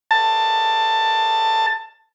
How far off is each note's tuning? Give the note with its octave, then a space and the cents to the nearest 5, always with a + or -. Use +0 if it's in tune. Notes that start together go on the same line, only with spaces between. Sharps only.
A5 +15